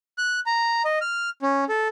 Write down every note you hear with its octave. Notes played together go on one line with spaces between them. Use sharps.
F#6
A#5
D#5
F6
C#4
A4